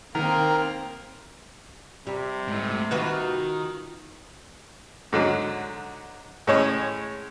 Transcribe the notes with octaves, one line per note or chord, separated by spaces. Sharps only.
D#3 A#3 C4 A#4
C3 G3
G#2 A3
D#3 F4 F#4 B4
G#2 D3 F#3
A2 G#3 C#4 C#5